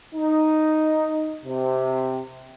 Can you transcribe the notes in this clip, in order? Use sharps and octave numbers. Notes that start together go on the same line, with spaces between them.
D#4
C3